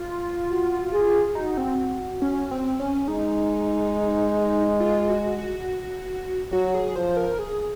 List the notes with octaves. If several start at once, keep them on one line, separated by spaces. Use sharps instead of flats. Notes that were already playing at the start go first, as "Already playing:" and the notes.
Already playing: F4
F#4
G#4
D#4 F#4
C4
C#4
C4
C#4
G#3 D#4
F4
F#4
F#4
F#3 F#4
G#4
F3 C5
A#4
G#4